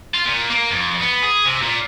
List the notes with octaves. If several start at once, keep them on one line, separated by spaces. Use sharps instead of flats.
F4
A#2
A#3
F2
B3
G#4
C3
A#2